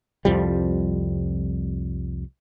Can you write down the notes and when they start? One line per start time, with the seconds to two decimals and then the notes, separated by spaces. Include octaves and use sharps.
0.25 C2 F2 F3 G3